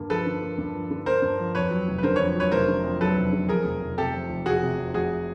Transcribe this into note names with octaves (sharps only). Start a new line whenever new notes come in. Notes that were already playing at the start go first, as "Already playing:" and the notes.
Already playing: G2 D3 A#3
F3 A4 B4
D3
A#3
G2
F3
D3
A#3 A#4 C5
G2
F3
F2 B4 C#5
F#3
F1
B4
D3 A#4 C5
F2 B4 C#5
F#3 B4 C#5
F1 A#4 C5
D3
F2
F#3 A4 B4
F1
D3
F2 G#4 A#4
F1
F1
C3 G4 A4
F2
F1
F1 F#4 G#4
C3
F2
F1 F#4 G#4